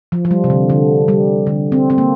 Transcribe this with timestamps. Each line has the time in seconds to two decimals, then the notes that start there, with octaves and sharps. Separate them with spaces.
0.12 F3
0.25 F3
0.31 G3
0.44 C3
0.50 D3
0.70 D3
1.08 G3
1.47 D3
1.72 C4
1.90 C4
1.98 A#3